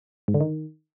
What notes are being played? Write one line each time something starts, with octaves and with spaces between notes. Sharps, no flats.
G#2
D3
D#3